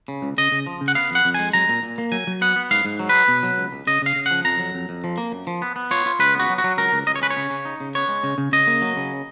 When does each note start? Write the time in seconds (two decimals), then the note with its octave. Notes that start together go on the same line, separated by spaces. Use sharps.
0.08 C#3
0.22 C#2
0.38 C#3 D#5
0.52 C#3
0.66 F3
0.81 C#3
0.88 F#5
0.95 B3 F5
1.11 F2 F#5
1.25 F2
1.34 G#3 G#5
1.53 F#3 A#5
1.69 A#2
1.83 A#2
1.98 A#3
2.12 F#3 G#5
2.27 F#3
2.41 B3 F#5
2.56 B3
2.71 G#2 F5
2.85 G#2
2.99 F#3
3.09 B4
3.14 B3
3.28 B2
3.43 F#3
3.58 C#2
3.72 C#2
3.87 C#3 D#5
4.02 C#3 F5
4.16 C#3
4.26 F3 F#5
4.45 F2 A#5
4.59 F#3
4.74 F2
4.89 F2
5.04 F3
5.18 A#3
5.32 F#2
5.47 F3
5.62 B3
5.76 B3
5.91 F4 C#5
6.06 F4
6.19 C#2 B4
6.35 B3 F#4
6.49 F#3
6.58 F#4
6.64 F#3
6.77 C#2 A#4
6.92 C#2
7.07 C#2 D#5
7.15 C#5
7.22 C#4 B4
7.30 C#5
7.37 C#3
7.50 C#3
7.65 D#4
7.80 C#3
7.95 B3 C#5
8.08 G#3
8.24 C#3
8.38 C#3
8.52 C#3 D#5
8.67 A#3
8.82 F#3
8.97 C#3